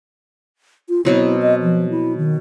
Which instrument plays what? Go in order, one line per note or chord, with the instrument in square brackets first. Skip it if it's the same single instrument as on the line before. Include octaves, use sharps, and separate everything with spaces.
[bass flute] F4
[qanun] B2 F#3 C4 [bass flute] E4
[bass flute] D#5
F3
E4
D#3